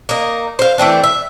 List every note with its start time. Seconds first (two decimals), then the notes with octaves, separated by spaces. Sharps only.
0.09 A#3 D#4
0.59 C5 F5
0.78 E3 A3 C4 D4
1.04 E5